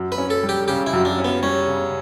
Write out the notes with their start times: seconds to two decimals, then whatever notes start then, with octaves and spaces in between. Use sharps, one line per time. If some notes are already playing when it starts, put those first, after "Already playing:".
Already playing: F#2
0.12 B4
0.18 C#4
0.30 A4
0.43 G3
0.49 G4
0.68 C#3 G4
0.87 E4
0.93 F#2
1.05 D4
1.18 C#4
1.25 B3
1.43 G3 C#4
1.67 C#3